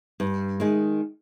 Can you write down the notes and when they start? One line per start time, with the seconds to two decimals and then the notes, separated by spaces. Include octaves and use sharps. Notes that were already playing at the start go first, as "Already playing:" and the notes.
0.20 G2
0.60 D#3 G#3